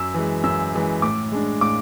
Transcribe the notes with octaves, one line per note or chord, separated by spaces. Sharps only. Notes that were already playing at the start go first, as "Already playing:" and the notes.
Already playing: F#2 E6
E3 G#3
F#2 E6
E3 G#3
A2 D6
G#3 D4
A2 D6